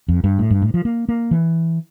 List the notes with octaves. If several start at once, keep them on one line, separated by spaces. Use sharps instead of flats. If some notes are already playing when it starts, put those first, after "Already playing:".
F2
G2
A2
G2
A2
F3
A#3
A#3
E3